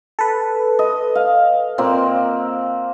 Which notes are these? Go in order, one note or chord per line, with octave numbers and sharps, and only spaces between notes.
A4 B4
D#5
F5
A#2 A#3 C4